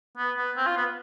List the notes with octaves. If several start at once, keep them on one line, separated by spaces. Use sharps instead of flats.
B3
B3
C4
F4
B3